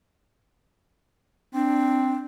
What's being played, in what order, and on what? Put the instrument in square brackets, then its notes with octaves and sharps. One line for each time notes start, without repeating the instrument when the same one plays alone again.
[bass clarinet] C4 [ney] D4